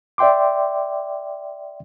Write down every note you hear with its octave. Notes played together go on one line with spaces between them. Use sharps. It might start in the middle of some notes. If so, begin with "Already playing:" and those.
D5 E5 G5 C6 D6